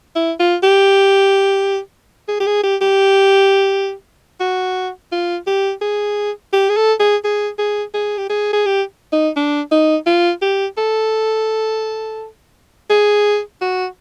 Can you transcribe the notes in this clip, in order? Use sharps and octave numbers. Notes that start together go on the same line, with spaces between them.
E4
F4
G4
G#4
G4
G#4
G4
G4
F#4
F4
G4
G#4
G4
G#4
A4
G#4
G#4
G#4
G#4
G4
G#4
G#4
G4
D#4
D4
D#4
F4
G4
A4
G#4
F#4